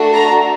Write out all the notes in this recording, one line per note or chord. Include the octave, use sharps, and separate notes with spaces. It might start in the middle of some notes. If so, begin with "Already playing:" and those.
Already playing: A3 D4 F#4 A4
A#5